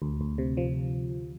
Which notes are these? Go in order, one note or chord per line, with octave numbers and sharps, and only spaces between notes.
D2
D2
C3
F3